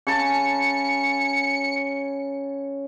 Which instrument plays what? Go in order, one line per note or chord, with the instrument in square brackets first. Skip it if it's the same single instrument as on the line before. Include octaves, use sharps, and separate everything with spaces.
[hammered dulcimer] C#3 A5 [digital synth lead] C#7